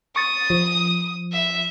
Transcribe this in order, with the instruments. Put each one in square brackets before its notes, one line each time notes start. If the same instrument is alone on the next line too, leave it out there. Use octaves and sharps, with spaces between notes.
[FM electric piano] C#6 A6 [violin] D#6
[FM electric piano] F3
[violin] E5